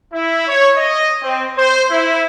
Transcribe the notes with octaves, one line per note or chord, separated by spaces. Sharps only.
E4
C#5
D#5
C4
C5
E4